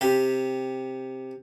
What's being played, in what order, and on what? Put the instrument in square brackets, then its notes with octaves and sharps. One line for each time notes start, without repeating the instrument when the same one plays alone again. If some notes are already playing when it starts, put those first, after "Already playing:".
[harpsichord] C3 G4